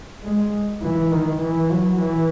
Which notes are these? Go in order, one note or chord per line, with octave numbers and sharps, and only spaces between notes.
G#3
E3
D#3
E3
F#3
E3